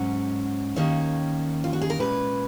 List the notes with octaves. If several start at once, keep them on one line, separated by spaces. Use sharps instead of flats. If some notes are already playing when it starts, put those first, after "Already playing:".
Already playing: G#2 F#3 C#4 F#5
D#2 D#3 A#3 C#4 C#5
F4
F#4
G#4
A#4
A#2 G#3 C#4 B4